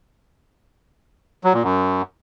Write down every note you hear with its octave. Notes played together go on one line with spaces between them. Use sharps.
F#3
A#2
F#2